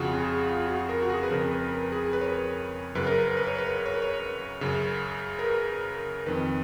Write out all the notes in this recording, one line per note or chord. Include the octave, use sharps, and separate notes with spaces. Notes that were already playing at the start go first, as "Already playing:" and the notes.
Already playing: F2 C#3 F4 F#4 G#4
G#4
F4
F#4
A#4
F#4
G#4
B4
F2 C#3 A#4
B4
A#4
G#4
B4
C#5
B4
F#2 C#3 B4
A#4
B4
B4
C#5
B4
C#5
B4
C#5
F#2 C#3
A#4
B4
F2 D#3 B4